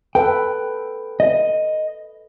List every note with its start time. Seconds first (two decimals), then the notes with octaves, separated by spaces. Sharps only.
0.15 A4 B4 G5
1.20 D#5